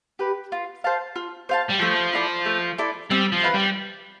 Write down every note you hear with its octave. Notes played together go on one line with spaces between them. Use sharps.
G4 B4
F4
C5 F5 A5
F4
C5 F5 A5
G3
F3 A3
E4 A4 D5
A3
E4 A4 D5
G3 C4
F3
E4 B4 F5
G3